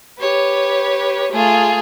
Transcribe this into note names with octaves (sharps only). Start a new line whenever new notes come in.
G4 B4 C#5
A3 F4 G#4